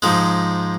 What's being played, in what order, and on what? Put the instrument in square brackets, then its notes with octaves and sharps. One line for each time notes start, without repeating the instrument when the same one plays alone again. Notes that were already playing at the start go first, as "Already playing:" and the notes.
[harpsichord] G#2 F3 G#3